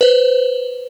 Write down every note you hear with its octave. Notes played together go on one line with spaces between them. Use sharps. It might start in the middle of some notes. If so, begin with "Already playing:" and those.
B4 C5